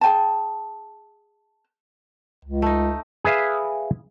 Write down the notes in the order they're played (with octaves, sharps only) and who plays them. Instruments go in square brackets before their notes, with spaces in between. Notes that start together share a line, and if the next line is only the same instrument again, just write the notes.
[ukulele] G#4 G5 A5
[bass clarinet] C#2
[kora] A3 D#4
[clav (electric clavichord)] G#4 B4 E5 F5